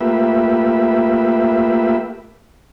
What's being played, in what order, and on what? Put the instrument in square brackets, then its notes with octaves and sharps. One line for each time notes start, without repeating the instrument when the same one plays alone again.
[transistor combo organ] A3 A#3 F4 G4 B4 E5